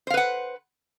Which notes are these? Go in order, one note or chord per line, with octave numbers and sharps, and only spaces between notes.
B4 C5 F5 F#5